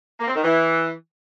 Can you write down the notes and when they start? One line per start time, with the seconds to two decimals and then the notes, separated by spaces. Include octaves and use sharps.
0.20 A#3
0.28 C4
0.36 D#3
0.43 E3